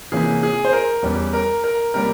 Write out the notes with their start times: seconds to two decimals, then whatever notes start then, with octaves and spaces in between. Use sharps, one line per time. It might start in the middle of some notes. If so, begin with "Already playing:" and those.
0.12 C3 E3 A#3 C#4 G#4
0.43 G#4
0.65 C5
0.73 A#4
1.03 E2 E3 G3 C#4
1.33 A#4
1.64 A#4
1.94 C3 G3 A#3 C#4 A#4